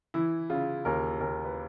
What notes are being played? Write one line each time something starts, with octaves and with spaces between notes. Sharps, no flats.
E3 E4
C#3 F4
D#2 A#4
D#2 A#4
B4